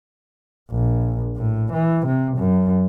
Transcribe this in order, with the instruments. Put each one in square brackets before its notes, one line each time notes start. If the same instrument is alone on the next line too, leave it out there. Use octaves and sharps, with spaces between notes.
[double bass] A#1
A2
E3
C3
F#2